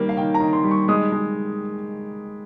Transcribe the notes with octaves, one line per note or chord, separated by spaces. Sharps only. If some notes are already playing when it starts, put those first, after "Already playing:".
Already playing: D#3 G3 A#3
F5
D#3 G5
A#5
D#3
C6
G3
C#6
G#3 D#6
G#3